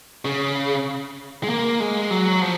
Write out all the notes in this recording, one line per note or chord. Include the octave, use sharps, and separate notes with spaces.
C#3
G#3
A#3
G#3
F#3
F3